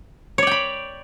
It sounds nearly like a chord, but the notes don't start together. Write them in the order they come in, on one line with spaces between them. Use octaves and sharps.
C#5 D5 G5 B5